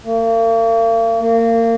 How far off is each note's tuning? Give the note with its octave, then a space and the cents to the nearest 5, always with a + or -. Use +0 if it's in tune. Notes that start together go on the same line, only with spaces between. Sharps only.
A#3 -40
A#3 -25